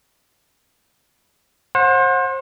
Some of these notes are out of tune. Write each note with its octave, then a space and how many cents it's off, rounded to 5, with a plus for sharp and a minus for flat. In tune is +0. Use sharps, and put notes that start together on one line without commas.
C5 +30 F#5 -30